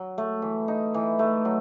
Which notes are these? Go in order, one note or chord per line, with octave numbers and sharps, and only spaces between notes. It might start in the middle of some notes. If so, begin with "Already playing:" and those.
Already playing: F#3
A3
E3
D#4
E3
A3
F#3